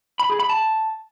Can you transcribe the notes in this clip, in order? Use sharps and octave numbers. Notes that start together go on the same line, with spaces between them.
B5
G#4
B5
A5